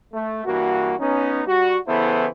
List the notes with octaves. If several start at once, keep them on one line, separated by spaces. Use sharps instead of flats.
A3
G2 E3 A#3 F#4
B3 C#4 D#4
G3 F#4
C#3 E3 B3 E4 A4 C5